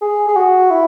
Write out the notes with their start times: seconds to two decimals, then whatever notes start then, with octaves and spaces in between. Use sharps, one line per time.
0.01 G#4
0.28 G#4
0.36 F#4
0.70 E4